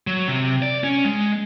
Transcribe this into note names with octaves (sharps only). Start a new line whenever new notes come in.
F#3
C3
D5
C#4
G#3